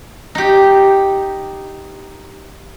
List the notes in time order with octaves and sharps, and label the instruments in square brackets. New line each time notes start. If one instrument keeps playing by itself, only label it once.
[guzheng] D#4 G4